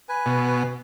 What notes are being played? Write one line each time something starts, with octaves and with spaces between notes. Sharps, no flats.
B4 G#5
B2